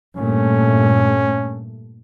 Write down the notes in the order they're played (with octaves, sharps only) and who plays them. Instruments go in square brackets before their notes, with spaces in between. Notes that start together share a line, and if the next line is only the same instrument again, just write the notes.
[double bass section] G2 A#2 A3 [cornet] C#4